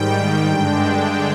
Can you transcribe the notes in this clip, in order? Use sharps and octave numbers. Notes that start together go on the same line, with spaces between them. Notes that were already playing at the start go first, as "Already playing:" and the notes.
Already playing: G#2 D#3 G3 G5
G2 D3 G#3 D4